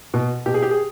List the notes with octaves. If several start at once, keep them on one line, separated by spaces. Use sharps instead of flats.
B2
B2 G4
G#4
G4
G#4